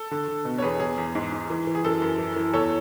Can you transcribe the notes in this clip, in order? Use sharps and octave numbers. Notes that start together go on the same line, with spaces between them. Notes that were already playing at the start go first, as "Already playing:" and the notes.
Already playing: A4
D3
D3
B2
C#5
E2 G#4 B4
E2 G#4
E2
G#2
G#2
E3
E3
G#4
F#2 A4
F#2
E3
E3
E2 A4 C#5